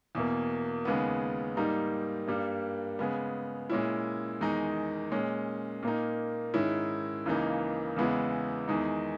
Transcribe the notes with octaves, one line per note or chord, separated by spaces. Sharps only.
E2 B2 A#3
D#2 C#3 G#3 B3
G#2 G3 A#3 D#4
G2 G3 A#3
C#3 G#3 B3
A#2 G#3 C#4 E4
E2 D#3 G#3 D#4
A#2 G#3 C#4
A#2 A#3 D#4
G#2 D#3 G#3 C#4 E4
C#2 C#3 E3 A#3 D#4
E2 C#3 G#3 B3 E4
E2 D#3 G#3 D#4